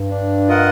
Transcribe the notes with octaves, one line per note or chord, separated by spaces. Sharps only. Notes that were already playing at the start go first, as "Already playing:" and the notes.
Already playing: G2
D4
F4 A#4 D#5 F#5